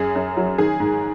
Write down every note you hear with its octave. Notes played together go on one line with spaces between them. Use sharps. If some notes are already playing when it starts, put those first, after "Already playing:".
Already playing: F#2 G#4
F#2
F#3
D#3 G#4
G#2